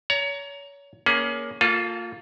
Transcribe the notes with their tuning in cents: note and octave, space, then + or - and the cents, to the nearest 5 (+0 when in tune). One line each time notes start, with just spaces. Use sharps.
C#5 +30 A#5 +0
A#3 +15 C#4 +20 G#4 +25
A#3 -30 F4 +15 A4 -20